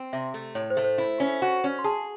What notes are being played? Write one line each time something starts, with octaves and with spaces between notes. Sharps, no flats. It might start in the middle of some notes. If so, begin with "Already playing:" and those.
Already playing: C4
C3 E5
A3
A2 C#5
C5
A3
C5
E4
C#4
F#4
C#4
C6
G#4 A5